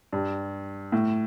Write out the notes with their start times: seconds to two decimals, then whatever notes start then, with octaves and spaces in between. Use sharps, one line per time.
0.13 G2
0.92 A2